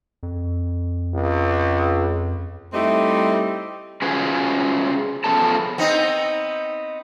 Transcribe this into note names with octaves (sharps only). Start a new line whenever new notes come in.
F2
C#2
G3 A3 C4 D#4 E4 G4
C#4 F4 F#4 G#4 B4 C5
C#3 F3 B3 A4 A5
B3 C4 D#4